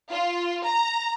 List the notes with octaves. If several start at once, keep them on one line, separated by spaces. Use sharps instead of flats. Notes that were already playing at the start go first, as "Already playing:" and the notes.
F4
A#5